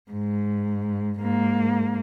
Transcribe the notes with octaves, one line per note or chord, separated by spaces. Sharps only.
G#2
G#2 A#3